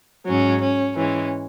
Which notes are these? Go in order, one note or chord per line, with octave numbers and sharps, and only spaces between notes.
G#2 F#3 C#4
C#4
G#2 E3 G#3 C#4